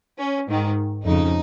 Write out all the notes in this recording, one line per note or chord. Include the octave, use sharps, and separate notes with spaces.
C#4
G#2 D#3
F2 C#3 D#4